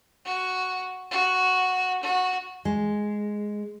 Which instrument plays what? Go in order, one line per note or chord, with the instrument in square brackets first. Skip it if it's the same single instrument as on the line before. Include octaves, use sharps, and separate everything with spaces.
[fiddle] F#4
F#4
F#4
[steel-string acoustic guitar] G#3